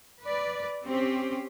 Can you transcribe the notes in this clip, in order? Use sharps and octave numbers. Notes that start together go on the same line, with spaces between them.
B4 D5
C4 C#4 G4